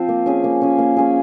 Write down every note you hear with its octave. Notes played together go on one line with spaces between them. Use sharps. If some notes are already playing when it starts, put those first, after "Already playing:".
Already playing: F3 C4 F4 C5
A#3
C#4 G#4
A#3
C#4 G#4
A#3
C#4 G#4